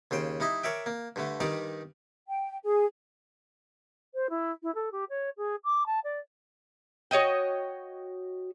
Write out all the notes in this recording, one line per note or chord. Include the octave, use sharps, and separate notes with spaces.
D#2 C#3 C5 G5
G3 D#4 E4 D#5
A#4 C#5 D5 E5 G5
A#3
G2 D3 A3
G2 D#3 G3 D#4 D5 A#5
G5
G#4
C5
E4
E4
A4
G4
C#5
G#4
D6
A5
D5
F#4 C#5 D#5 G5